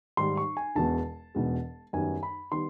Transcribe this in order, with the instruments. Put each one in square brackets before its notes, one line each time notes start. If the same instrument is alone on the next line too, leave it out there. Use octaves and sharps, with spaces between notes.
[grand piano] G#2 D#3 G3 C6
C#6
G#5
E1 E2 B2 G#3 A5
E1 E2 B2 G#3
F#2 D#3 G3 B3 G#5
B5
D#3 G3 B3 C6